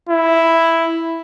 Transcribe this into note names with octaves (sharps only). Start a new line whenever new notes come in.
E4